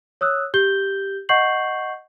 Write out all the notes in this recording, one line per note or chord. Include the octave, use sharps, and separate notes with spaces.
C#5 D#6 E6 F#6
G4 G6 G7
D#5 F#5 C#6 G6 C7 F#7